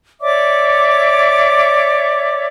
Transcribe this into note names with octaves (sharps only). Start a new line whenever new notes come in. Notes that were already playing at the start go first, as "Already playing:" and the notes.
C#5 D5 E5 D6